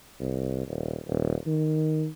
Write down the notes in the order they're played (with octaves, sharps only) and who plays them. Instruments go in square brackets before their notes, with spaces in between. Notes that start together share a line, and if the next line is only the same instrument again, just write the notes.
[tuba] C2
D#1
D#1
D#3